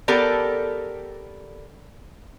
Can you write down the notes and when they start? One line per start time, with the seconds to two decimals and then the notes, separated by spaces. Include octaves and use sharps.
0.08 B3 G4 A4 A#4 D5